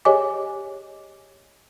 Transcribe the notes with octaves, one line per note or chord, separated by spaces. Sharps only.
G4 G#4 C#5 D#5 G#5 D6